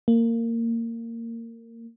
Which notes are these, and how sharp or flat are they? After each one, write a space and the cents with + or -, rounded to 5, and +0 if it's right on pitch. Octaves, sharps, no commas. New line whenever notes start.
A#3 -20